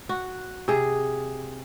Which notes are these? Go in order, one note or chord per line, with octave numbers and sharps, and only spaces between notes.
F#4
C3 G#4